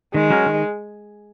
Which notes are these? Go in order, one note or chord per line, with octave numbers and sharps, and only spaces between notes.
D#3 G#3
F#3 C#4 F#4 A#4
D#3